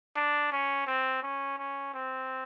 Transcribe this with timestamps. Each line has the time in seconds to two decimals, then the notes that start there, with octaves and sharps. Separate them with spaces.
0.16 D4
0.52 C#4
0.86 C4
1.23 C#4
1.58 C#4
1.94 C4